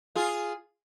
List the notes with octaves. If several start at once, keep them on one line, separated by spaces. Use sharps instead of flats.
F4 G#4